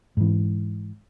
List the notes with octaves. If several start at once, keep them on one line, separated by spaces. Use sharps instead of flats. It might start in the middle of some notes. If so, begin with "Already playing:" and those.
G#2 E3